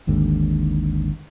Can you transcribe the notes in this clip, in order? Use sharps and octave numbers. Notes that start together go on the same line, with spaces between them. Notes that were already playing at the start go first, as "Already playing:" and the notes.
G#1 D#2 G#2 D3